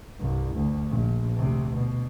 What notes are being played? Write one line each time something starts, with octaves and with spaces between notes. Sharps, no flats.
C2 G2
D2
A#1
D2 C3
B2